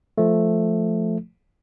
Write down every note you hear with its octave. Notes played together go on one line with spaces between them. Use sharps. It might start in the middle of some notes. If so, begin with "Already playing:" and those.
F3 A3